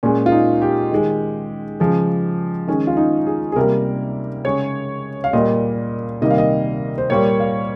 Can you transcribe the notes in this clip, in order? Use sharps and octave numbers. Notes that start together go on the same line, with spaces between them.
A#2 G#3 C#4
F4
D#4
G4
D#3 G#3
C#3 F3 G#3
D#3 G#3 C#4
F4
D#4
G#4
G#4
C3 G3 A#3 A#4
C#3 G#3 C#5
F5
A#2 G3 A#3 D#5
C3 D#3 G3 A#3 D#5
F5
D#5
C5
A#2 G3 A#3 C#5
F5